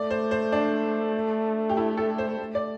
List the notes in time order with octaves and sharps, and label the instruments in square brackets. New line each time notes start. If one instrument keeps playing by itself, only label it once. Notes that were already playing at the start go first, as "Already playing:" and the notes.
Already playing: [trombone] A3 [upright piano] D5
[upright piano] C5
C5
D4
G4
E4
A4
C5
[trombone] A3
[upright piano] D5